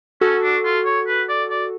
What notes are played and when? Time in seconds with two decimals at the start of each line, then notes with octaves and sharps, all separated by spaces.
0.21 C#4 F#4 A4
0.43 D4
0.65 F4
0.85 C#5
1.07 B4
1.29 D5
1.50 D5